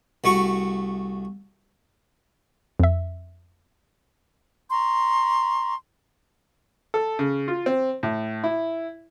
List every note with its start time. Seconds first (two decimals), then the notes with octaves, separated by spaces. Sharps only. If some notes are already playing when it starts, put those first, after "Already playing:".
0.24 C2 A3 F#4 C#6
2.80 F2 E5
4.71 A#5 C6 C#6
6.94 A4
7.19 C#3
7.48 F4
7.66 C4
8.03 A2
8.44 E4